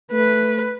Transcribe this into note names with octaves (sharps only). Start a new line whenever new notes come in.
A3 B4